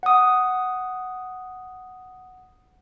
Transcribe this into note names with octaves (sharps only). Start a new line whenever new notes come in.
F#5 D#6